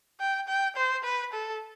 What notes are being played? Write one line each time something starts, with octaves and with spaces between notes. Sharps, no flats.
G5
G5
C5
B4
A4